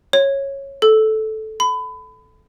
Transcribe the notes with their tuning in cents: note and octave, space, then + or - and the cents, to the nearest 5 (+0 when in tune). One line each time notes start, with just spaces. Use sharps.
C#5 -10
A4 -10
B5 +30